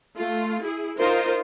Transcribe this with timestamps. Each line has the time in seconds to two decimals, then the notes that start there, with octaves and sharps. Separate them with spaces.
0.16 A3 F4
0.62 E4 G#4
0.97 D#4 F4 A#4 C5